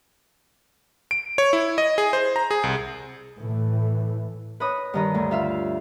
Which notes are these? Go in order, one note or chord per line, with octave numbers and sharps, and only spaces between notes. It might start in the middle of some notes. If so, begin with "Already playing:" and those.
D7
C#5
E4
D#5
G#4
C5
A#5
G#4
C2
A2 E3
B4 C#5 D#5 B5 D#6
G2 D#3 D#5
D2
F4 E5 F5